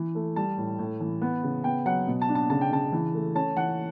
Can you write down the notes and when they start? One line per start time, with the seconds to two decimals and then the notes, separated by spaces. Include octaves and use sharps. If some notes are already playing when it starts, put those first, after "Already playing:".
Already playing: E3
0.15 A3
0.36 G3 A5
0.57 A2
0.79 A2
1.00 E3
1.21 B3
1.43 C#3
1.64 B3 G5
1.86 F#3 F#5
2.07 B2
2.22 A5
2.29 D4
2.35 A5
2.50 C#3 A5
2.61 G5
2.71 C#3 A5
2.92 E3
3.14 A3
3.35 C#4 A5
3.57 E3 F#5